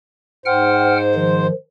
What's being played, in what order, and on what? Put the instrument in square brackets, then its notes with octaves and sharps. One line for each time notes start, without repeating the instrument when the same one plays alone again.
[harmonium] G#2 C5 [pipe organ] F#5 G5 F6
[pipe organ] D#3 F3